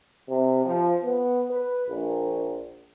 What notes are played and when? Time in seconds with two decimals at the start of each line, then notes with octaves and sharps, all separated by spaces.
0.28 C3
0.64 F3
1.02 B3
1.50 B4
1.88 A#1